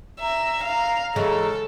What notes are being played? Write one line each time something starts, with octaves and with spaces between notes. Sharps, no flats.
E5 A#5
F5
C#3 E3 G#3 A4